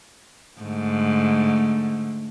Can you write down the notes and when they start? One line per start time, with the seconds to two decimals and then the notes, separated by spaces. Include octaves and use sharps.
0.61 G#2 D3 A3